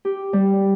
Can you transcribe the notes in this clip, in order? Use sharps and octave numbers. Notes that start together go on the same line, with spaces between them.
G4
G3